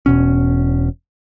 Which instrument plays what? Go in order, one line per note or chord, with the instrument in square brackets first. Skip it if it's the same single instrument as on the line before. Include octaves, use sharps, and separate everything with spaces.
[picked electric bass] E1 B2 C#4